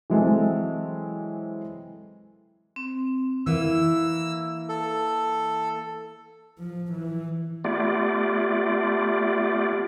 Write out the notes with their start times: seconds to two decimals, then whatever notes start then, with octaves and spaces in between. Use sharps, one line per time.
0.10 E3 F#3 G#3 C4 A4
2.76 C4
3.46 E3 A#3 E6
4.69 A4
6.59 F3
6.92 E3
7.64 A3 B3 F4 G4 D5